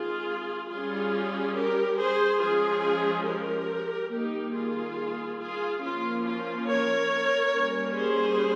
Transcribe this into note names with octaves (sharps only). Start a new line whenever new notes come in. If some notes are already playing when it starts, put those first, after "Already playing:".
Already playing: D#3 G#3 C4 F4 G#4
G3 C#4 F4 G#4
G4 A#4
G#4 C5
F3 G#3 C#4 F4 G#4
G4 A#4
D#3 G3 A#3 D#4 G4
F4 G#4
F4 G#4
F3 A#3 C#4 F4
F4
A#4 C#5
G3 A#3 C#4
G#4 C5